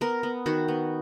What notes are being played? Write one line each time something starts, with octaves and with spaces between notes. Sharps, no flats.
B3 A#4
B3
D#3 F#4
B3